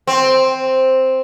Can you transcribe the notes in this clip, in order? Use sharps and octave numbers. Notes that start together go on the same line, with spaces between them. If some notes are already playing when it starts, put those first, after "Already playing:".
C4